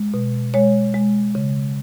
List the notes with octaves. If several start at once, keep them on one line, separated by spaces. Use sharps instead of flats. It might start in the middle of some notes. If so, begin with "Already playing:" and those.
Already playing: G#3
B2
G#3 C#5
G#3
C#3